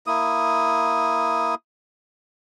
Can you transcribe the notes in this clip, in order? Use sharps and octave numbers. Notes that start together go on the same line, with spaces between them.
A#3 E4 D#6